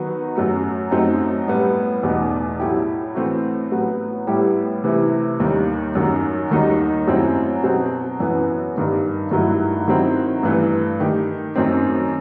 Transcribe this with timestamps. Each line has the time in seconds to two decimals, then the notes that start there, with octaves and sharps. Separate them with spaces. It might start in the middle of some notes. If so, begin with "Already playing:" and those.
Already playing: D#3 F#3 B3 D#4 F#4
0.35 F#2 F#3 A3
0.91 F#2 F#3 A3 C4 D#4
1.48 A2 G3 B3
2.03 E2 B2 A3 D#4
2.60 A2 F#3 A3 E4 G4
3.15 A2 E3 A3 C4 F#4
3.72 A2 F#3 B3
4.27 A2 G3 B3 E4 G4
4.84 C3 E3 A3 E4
5.40 D#2 D#3 G3
5.95 F#2 D#3 F#3
6.51 D#2 D#3 G3 D#4 F#4
7.08 F#2 F#3 A3 C4 E4
7.64 B2 F#3 C4
8.20 F#2 E3 B3
8.76 G2 D#3 G3
9.31 G2 D#3 F#3 A3 E4
9.88 D#3 F#3 C4 E4
10.43 G2 E3 A3
11.00 D#3 A3 D#4 G4
11.56 F#2 D#3 A3 C4